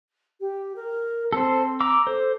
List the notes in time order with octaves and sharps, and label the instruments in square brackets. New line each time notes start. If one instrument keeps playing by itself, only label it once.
[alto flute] G4
A#4
[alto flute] C4 [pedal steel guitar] A4 C5
[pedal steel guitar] A#5 D6 E6
[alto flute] A4 [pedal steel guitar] C5